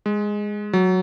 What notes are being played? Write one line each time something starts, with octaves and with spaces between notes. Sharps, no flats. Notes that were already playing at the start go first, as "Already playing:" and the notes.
G#3
F#3